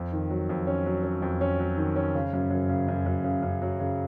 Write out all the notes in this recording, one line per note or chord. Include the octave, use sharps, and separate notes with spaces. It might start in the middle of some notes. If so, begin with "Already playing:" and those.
Already playing: F2
D#3
F#3
F2
C#4
F#3
C#4
F2
C#4
F#3
D#3
C#4
C#3
F#2
F#2
C#3
F#2
F#2
C#3
F#2
F#3
C#3